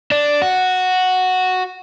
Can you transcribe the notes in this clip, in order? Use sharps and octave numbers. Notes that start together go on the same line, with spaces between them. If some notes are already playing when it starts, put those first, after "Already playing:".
D4
F#4